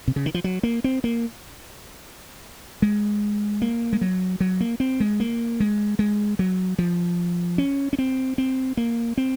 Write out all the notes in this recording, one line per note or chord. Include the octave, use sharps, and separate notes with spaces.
C3
C#3
D#3
F3
F#3
A#3
C4
A#3
G#3
A#3
G#3
F#3
F#3
A#3
C4
G#3
A#3
G#3
G#3
F#3
F3
C#4
C#4
C4
C4
A#3
C4